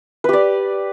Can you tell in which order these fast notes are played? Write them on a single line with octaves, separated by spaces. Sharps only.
B4 G4 D5